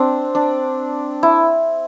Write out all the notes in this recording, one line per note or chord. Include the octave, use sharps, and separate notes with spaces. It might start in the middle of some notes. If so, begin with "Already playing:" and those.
Already playing: C4 D4
D4
E4